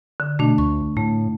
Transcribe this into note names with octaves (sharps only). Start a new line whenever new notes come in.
D3
B2 A3 D4
D2 C#6
A2 A3